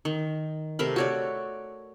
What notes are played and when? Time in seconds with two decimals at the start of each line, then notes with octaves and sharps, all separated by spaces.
0.05 D#3
0.79 C3 A3 A#4 B5
0.96 F#4 C#5 D5